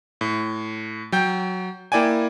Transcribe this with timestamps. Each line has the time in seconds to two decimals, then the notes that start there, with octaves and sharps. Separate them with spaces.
0.21 A2
1.12 F#3 G5 G6
1.92 A#3 E4 D5 G5 G#5